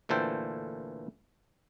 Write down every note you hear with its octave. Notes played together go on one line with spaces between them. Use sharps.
D2 A#2 E3 A4 C5 G5